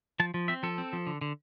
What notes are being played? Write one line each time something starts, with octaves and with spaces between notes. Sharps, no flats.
F3 A5
F3
C4 E5
F3 A4
C4
F3
D3
D3